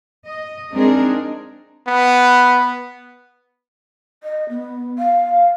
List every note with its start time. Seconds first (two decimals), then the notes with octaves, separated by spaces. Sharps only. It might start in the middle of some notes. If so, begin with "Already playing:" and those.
0.25 D#5
0.72 G#3 C4 D4 D#4 G#4 A#4
1.88 B3
4.23 D#5
4.49 B3
4.99 F5